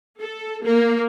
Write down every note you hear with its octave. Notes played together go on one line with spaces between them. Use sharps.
A4
A#3